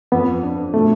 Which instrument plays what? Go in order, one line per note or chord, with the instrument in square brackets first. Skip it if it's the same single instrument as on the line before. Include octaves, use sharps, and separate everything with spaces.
[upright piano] F2 [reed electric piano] B3
[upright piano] D4
[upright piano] B2 [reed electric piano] A3